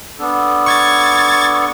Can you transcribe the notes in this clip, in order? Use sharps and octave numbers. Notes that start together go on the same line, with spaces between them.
B3 D4 A4
C#6 G#6 A6